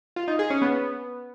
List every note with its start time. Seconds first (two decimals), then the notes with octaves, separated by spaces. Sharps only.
0.16 F4
0.28 D#4
0.39 G#4
0.50 C#4
0.62 B3